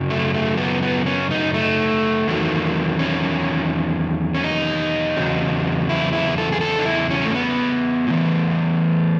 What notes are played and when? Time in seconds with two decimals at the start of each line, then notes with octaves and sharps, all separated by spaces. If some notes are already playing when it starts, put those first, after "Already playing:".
Already playing: F#2 C#3 F#3
0.10 A3
0.34 A3
0.57 B3
0.83 B3
1.06 C#4
1.31 D#4
1.54 A3
2.28 E2 D#3 F#3
2.99 C#4
4.34 C#4
4.44 D#4
5.17 E2 C#3 F#3
5.89 E4
6.13 E4
6.38 A4
6.52 G#4
6.61 A4
6.79 D#4
6.85 E4
7.10 C#4
7.26 A3
7.35 B3
8.07 A2 E3